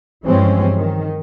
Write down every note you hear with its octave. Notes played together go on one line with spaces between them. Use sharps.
G2 E3 F3 G#3 C4 C#4
D#3